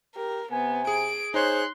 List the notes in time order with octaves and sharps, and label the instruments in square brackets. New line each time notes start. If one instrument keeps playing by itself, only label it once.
[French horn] G4 [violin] A#4
[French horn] C3 [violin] B3 [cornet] G#5
[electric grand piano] G#4 [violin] D7
[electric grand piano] D#4 C#5 [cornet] G#4 [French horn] C5 [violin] C6 F#6